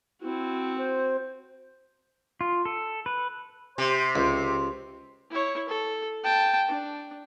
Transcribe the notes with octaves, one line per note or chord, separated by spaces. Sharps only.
C4 E4 F#4
C5
F4
A4
B4
C3 C5
C#2
E4 C#5
A4
G5 A5
D4